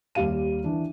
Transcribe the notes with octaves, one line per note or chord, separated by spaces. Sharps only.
D#2 G3 F5 D#7
E3 D4